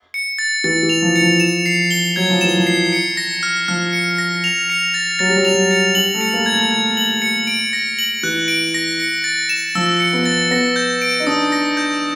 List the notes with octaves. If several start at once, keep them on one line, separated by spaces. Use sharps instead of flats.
C#7
A6
E3 A6
E3
F7
F3
C#7
F3
E7
C7
G7
F#3 G#6
F3
E3 E7
F3
C7
C#7
A#6
F6
F3 F6
C#7
A#6
F7
C#7
A6
F#3 A6
G3
F#3
G3 F7
F#3
C#7
G3 F#7
A3
C#7
A#3
G#6
A3
G#6
F#7
C#7
D7
A#6
F#7
E3 F#6
D7
A#6
C#7
A6
E7
F3 E6
C#7
B3
A6
B3 A#6
G6
D7
D#4
D4 D#6
A#6
G6